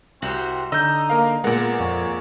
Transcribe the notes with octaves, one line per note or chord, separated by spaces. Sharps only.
C2 C4 F#4 G4 C5
D3 D#4 D#5 E6 G6
A#3 A#4 F5
A#2 G#3 B3 A#4 F#5
F2 C#5